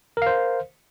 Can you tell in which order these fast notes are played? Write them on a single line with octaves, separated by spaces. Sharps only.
A#4 F5 C5